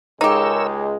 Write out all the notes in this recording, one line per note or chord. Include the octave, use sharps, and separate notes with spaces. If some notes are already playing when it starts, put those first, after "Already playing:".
C#2 G#3 D#4 G4 A#4 C#5 E6